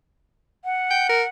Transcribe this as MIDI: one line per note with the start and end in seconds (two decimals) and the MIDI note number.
0.65 1.29 78
0.91 1.09 79
1.09 1.23 70